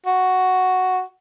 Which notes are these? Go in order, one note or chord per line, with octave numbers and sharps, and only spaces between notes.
F#4